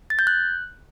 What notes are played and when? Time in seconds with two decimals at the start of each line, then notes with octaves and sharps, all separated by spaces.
0.10 A6
0.19 G6
0.27 F#6